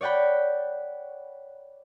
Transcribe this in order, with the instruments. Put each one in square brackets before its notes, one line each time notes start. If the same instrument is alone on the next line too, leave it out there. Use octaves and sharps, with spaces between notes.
[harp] C#5 D5 F#5 G5 B5